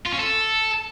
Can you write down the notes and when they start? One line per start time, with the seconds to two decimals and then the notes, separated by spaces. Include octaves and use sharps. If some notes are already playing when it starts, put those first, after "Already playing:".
0.06 F4
0.12 C#4
0.19 A4